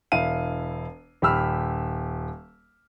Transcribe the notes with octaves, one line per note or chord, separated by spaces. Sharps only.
E1 E4 F5 D#7
D#1 G4 B5 E6 F6